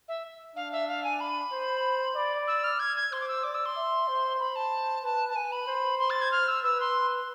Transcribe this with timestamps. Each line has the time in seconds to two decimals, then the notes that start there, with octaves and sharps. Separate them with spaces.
0.08 E5
0.56 D4 F5
0.72 E5
0.89 F5
1.04 G#5
1.20 B5
1.52 C5
2.16 D5
2.47 E6
2.64 F6
2.80 G#6
2.97 G#6
3.12 C5 C6
3.21 D6
3.28 E6
3.44 D5 D6
3.54 E6
3.66 C6
3.77 E5
4.08 C5
4.40 C5 B5
4.56 A5
5.03 B4 A5
5.29 A5
5.36 B4 G#5
5.52 B5
5.68 C5
5.99 C6
6.10 A6
6.21 G#6
6.32 F6
6.48 E6
6.64 B4 E6
6.80 C6